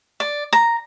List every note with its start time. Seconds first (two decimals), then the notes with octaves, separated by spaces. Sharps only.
0.20 D5
0.53 A#5